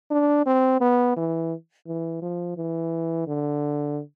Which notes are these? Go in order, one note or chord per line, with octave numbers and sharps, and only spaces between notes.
D4
C4
B3
E3
E3
F3
E3
D3